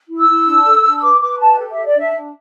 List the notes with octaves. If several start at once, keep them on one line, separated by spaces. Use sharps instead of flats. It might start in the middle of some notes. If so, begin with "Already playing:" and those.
E4
E6
E4
D4
A4
D4
E6
B4 D6
B4 D6
G4 A5
A4
A4 E5
D5
D4 E5
D4